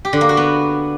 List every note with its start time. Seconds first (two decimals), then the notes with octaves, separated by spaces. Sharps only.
0.05 G4
0.13 D3
0.21 A#3
0.29 F#4
0.37 B3